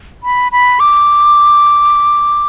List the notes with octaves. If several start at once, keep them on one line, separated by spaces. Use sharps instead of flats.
B5
B5
D6